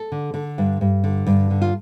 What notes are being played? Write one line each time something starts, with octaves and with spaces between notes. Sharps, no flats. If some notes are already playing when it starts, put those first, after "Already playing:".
Already playing: A4
D3
D3
G2
G2
D3
G2
D3
F4